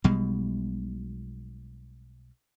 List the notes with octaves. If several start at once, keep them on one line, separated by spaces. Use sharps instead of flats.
B1 B2 G3 G#3